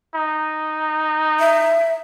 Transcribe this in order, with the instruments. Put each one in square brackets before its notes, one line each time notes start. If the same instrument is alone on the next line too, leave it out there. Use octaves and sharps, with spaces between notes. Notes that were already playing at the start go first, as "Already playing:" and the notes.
[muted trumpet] D#4
[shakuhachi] E5